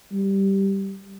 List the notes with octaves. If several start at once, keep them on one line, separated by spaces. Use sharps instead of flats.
G3